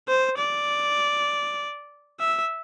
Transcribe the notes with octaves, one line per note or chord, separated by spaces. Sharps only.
C5
D5
E5